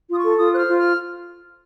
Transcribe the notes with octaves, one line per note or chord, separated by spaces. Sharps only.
F4 D#6
C#6
A4
F4 D#6
C5 F6 F#6
F4
F6